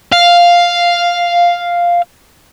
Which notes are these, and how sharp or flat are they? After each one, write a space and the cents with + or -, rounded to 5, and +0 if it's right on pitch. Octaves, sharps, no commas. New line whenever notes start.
F5 +0